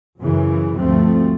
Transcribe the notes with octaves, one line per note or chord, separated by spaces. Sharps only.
F#2 C#3 E3
D2 G2 F3 A3 C4